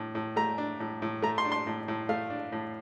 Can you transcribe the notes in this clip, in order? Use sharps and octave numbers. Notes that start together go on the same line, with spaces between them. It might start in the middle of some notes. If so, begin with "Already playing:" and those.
Already playing: A2 D4
A2
A3 A#5
D4
A2
A2
A3 A#5
C6
D4
C6
A2
A2
A3 F5
D4
A2